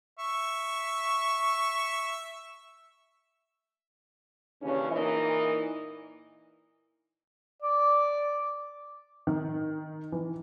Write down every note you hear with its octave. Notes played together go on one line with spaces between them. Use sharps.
E5 C#6
D#2 C#3 E3 C#4 D4
A#2 E3 A#3 D#4 D#5
D5
D#3
E3